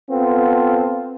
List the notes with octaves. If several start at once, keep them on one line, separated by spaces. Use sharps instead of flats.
B3 C4 F4 A4